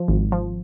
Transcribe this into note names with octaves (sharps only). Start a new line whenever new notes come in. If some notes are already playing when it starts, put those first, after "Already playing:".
Already playing: F3
G#1
F3